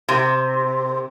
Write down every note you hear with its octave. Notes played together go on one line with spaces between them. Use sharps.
C3